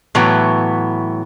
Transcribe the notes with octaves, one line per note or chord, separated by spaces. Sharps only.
A2 E3 F#3 B3